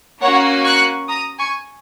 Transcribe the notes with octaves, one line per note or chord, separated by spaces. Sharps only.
A#3 C#4 F#4 C#5 F#5
C#6 F#6
A#5 D#6
G#5 C#6